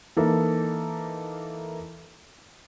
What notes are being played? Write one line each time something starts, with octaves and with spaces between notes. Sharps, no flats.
E3 A#3 D#4 A4